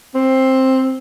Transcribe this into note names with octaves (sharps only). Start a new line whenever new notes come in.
C4